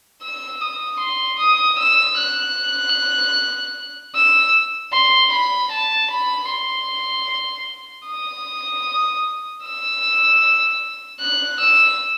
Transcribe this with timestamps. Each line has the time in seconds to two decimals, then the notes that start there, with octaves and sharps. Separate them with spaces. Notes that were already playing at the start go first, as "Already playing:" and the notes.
0.22 E6
0.61 D#6
1.00 C6
1.39 D#6
1.78 E6
2.17 F#6
4.15 E6
4.92 C6
5.33 B5
5.72 A5
6.11 B5
6.50 C6
8.07 D#6
9.64 E6
11.20 F#6
11.60 E6